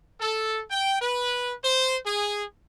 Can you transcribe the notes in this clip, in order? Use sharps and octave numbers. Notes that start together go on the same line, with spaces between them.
A4
G5
B4
C5
G#4